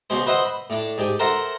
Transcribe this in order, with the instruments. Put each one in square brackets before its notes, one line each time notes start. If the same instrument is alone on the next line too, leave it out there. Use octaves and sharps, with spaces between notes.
[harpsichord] C#2 B2 C#4 C5
B4 C5 D#5 E5 F#5 C6
B5
A2 D4
G#2 G4 G#5
A4 A#4 C5 E5 F#5 A#5